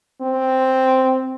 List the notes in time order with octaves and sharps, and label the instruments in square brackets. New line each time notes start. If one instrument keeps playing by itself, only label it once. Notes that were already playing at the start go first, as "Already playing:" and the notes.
[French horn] C4